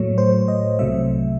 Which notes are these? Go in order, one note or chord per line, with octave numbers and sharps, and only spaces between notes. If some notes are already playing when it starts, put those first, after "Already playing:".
Already playing: A2 F#3 A3 C#5
C5
D#5
C2 C3 F#3 A3 E5